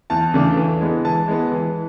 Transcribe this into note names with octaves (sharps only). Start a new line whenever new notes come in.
E2 A5
C#3 E3 A3 D4
E3
G#3 B3
E3 A5
G#3 B3
E3